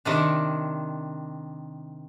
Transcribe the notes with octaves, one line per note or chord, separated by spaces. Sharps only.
C3 D#3 D4